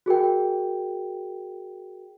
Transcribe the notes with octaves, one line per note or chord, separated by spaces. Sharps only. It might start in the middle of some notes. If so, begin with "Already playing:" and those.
F#4 G#4 A#4 G5